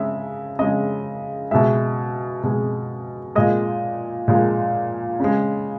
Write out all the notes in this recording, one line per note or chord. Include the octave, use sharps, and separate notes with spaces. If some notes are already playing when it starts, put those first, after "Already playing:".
Already playing: C#3 G#3 E5
C#3 G#3 D#5
B2 G#3 E5
B2 G#3
A#2 G#3 D#5
A#2 G#3
C#3 G#3